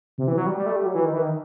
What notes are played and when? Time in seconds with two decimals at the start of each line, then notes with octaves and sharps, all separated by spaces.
0.18 C3
0.28 E3
0.38 F#3
0.46 G3
0.57 G3
0.66 A3
0.76 G3
0.86 F#3
0.95 E3
1.05 D#3
1.14 E3
1.22 D#3